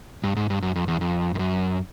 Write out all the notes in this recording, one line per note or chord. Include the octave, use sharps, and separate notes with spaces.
G2
G#2
G2
F#2
F2
E2
F2
F2
F#2